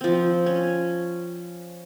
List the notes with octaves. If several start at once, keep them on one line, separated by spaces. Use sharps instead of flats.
F3 C4
C#4